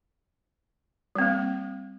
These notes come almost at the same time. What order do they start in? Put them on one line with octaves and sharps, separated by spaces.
G3 C4 A#3